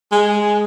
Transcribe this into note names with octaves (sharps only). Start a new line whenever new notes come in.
G#3